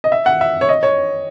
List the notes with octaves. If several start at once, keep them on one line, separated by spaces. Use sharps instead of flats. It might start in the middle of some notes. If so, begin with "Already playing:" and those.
D#5
E5
F#5
E5
C#5
D#5
C#5